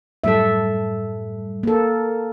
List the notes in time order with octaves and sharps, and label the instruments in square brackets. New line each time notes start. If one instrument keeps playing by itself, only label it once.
[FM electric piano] F#2 A2 G3 [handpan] A4 E5
[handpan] A#3 A4